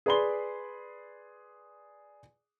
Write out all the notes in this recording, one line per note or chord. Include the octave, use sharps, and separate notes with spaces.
G#4 B4 D5 B5 C6 G7